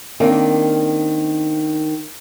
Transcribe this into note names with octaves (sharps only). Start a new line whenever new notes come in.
D#3 A#3 C4 D4